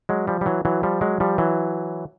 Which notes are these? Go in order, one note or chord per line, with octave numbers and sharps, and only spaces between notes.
F#3 G#3
F3 G3
G3
E3 F#3
E3 F#3
F3 G3
F#3 G#3
F3 G3
E3 F#3